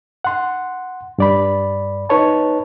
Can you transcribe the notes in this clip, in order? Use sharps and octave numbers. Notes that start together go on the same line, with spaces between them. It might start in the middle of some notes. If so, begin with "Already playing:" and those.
F#5 C6
G2 D5 B5
D#4 B4 C#5 A5